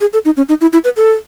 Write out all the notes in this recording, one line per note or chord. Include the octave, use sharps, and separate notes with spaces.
G#4
A4
D#4
C#4
D#4
E4
E4
B4
A4